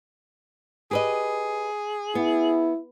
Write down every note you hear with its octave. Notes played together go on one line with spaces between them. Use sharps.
G4 G#4 B4 D#5
B3 E4